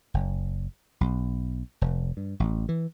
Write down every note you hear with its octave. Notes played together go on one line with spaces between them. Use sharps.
F#1
B1
F1
G2
A1
E3